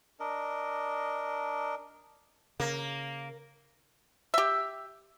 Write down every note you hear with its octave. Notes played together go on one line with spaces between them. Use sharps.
D4 A#4 D#5
C#3 A#3
G4 E5